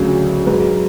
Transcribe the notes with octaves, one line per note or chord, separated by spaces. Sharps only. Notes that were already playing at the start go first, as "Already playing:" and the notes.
Already playing: D2 C#3 F#3 G#4
G#2 F#3 B4